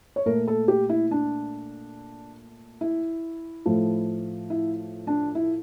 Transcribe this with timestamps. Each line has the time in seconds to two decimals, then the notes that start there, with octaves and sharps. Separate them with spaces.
0.16 C#5
0.26 A#2 A3 A#4
0.48 A4
0.68 G4
0.89 E4
1.11 D4
2.81 E4
3.66 A2 F3 A3
4.50 E4
5.07 D4
5.35 E4